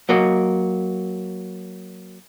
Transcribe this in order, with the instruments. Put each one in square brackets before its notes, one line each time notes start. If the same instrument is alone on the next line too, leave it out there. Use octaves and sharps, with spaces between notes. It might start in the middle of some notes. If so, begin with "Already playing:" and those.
[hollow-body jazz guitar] F#3 A#3 F#4 D#5